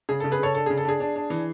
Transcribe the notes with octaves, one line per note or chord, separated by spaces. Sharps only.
C#3 G#4
C#3 A4
G#4 B4
C#3 A4 C#5
D4 A4
C#3 G#4
A4
D4 G#4
D4
D4
E3